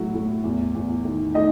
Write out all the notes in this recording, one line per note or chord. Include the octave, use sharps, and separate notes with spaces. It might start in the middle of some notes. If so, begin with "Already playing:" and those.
Already playing: A2 F#3 E4 F#4
A2
E2
E2
D#3
A3 D#4 D#5